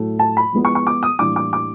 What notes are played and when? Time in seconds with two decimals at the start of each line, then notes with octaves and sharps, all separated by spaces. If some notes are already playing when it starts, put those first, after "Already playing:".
Already playing: A2 F#3 A3
0.19 A5
0.37 B5
0.53 F3 G#3 B3 E4
0.65 C#6
0.75 C#6
0.87 D6
1.03 D#6
1.19 A2 E3 G3 A#3 D4 D6
1.36 D6
1.53 D6